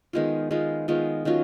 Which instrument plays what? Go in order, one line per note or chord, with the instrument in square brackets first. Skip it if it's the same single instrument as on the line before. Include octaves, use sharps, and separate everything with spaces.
[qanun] D#3 G#3 B3 F4
D#3 G#3 B3 F4
D#3 G#3 B3 F4
D#3 F#3 C#4 F4